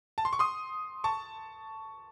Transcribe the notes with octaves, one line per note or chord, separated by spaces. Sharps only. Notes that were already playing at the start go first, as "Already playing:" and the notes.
A5
C6
C#6
C6 D#6
A5 C#6